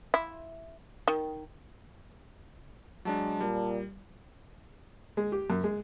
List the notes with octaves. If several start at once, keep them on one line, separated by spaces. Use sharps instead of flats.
E4
D#3
F#3 G#3 D4 A5
A#2 G3
G#3
G4
F#2
G#3